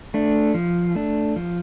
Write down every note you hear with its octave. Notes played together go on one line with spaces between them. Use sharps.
A3 D4
F3
A3 D4
F3